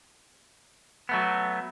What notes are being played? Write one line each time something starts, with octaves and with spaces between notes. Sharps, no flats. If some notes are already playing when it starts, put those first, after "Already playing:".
F#3 A3 B3